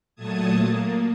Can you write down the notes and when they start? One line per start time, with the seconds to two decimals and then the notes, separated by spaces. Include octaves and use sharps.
0.15 A#2 F#3 A3 A5 D#6 G#6
0.60 A#3